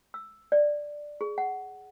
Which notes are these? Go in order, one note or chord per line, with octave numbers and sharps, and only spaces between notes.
E6
D5
G#4
F#5